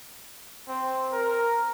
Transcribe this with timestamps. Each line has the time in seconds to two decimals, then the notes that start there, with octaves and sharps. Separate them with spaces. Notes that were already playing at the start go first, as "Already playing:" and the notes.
0.68 C4
1.12 A#4